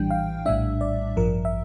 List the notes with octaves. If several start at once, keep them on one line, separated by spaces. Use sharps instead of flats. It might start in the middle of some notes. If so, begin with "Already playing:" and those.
Already playing: A#1 A2 E3 G3 D4 G5
F5
A#1 A2 G3 D4 E5
D5
A1 G2 F3 A#4
E5